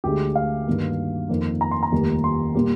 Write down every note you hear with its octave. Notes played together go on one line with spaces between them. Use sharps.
D2 D3 G#3 G4
F5
G2 D#3 A#3
F2 D#3 A#3
A#5
C6
A#5
F1 D#2 D#3 G3 A#3
C6
A#2 G3 A#3